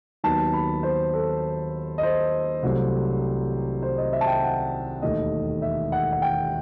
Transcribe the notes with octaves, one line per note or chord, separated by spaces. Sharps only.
D#2 D#3 F#3 B3 D#4 A5
B5
C5
A4
D#5
C5
C2 C3 F#3 A3 C4
C5
D#5
E5
A5
G5
F#5
E1 D#2 D#3 A3 D#5
E5
F#5
F#5
G5